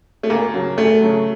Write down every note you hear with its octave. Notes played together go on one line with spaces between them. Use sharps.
A3
D2 A#3
C#3 F#3
D2 A3
C#3 F#3